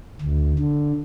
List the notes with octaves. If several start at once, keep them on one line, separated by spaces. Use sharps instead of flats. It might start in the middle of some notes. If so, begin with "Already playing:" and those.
D2
D3